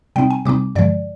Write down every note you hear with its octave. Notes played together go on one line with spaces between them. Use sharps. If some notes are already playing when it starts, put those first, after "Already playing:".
C3 G3 C4 D#4 G5
G#5
C3 G3 C4 D#4 D6
G2 D3 F3 G#3 D5